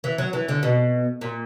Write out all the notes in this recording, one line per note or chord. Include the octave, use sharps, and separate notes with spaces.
E3
F#3
E3
D3
B2
A#2